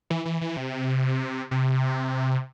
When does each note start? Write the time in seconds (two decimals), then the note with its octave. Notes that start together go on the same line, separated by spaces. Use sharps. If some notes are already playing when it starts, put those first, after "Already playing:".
0.10 E3
0.25 E3
0.41 E3
0.57 C3
1.51 C3